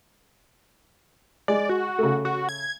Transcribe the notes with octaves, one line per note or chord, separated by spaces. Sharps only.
G#3 D5
F#4
C#3 A3
F#4
G#6